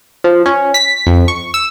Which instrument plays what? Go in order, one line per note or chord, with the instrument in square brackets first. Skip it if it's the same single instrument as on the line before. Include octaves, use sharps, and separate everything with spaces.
[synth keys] F3
C#4
B6
F2
C#6
E6